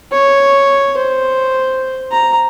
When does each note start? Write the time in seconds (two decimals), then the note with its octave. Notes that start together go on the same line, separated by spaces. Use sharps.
0.12 C#5
0.97 C5
2.12 A#5